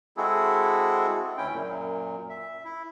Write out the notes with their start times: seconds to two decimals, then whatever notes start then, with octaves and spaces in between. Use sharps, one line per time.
0.17 G#3 C4 E4 F#4 G#4 A4
1.37 D2 C#4 E4 G5
1.52 F#2 A#2
2.30 E5
2.65 E4